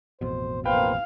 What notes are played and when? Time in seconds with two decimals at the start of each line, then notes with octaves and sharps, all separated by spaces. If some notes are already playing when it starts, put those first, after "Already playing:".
0.21 A1 F2 B2 C5
0.65 A#3 B4 C5 F5 G5